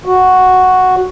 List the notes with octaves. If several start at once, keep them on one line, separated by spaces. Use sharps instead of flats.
F#4